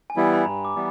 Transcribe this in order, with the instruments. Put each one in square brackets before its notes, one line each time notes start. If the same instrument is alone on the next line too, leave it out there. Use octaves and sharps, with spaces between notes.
[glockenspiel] G#5
[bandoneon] E3 G3 B3 E4
[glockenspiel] B5
[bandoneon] G2 [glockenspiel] A#5
[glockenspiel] D6
[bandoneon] E3 G3 B3